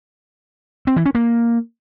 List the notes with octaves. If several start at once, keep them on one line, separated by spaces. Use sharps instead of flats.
C4
E3
C#4
A#3